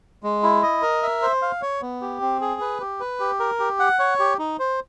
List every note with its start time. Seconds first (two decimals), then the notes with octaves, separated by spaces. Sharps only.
0.23 G#3
0.43 E4
0.63 D#5
0.82 A#4
1.03 E5
1.22 C5
1.42 F5
1.62 C#5
1.82 B3
2.01 G4
2.21 C4
2.41 G#4
2.61 B4
2.80 G4
3.00 B4
3.20 G4
3.40 A#4
3.59 G4
3.80 F#5
3.99 C#5
4.19 G4
4.39 D#4
4.59 C5